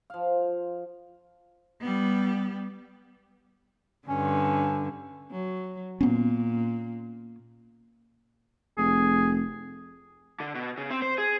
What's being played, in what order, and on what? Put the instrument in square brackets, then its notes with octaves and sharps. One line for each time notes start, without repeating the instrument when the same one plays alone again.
[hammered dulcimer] F3 F5
[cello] G3 B3
[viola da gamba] G2 D3 [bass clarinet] C#4
[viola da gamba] F#3
[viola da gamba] A#2 [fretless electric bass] B3 C#4
[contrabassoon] F1 [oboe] G#4
[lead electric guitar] D3
B2
C#3
C4
C5
G#4